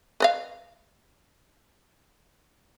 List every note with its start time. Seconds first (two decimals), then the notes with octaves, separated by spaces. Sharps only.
0.20 B4 D#5 F5